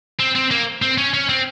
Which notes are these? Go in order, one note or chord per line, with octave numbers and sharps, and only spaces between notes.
C4
C4
A#3
C4
C#4
C#4
C4